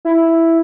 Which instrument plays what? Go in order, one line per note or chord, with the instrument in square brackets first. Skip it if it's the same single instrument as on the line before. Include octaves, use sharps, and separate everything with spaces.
[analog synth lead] E4